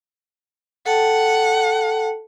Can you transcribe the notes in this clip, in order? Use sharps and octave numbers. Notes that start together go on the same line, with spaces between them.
A4 F#5 G5 A5